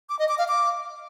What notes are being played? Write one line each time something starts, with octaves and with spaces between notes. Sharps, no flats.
D6
D#5
D6
F5
D6